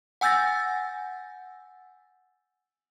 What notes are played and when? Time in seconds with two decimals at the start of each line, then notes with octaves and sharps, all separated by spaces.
0.21 F#5 G#5 E6 G6 A6 A#6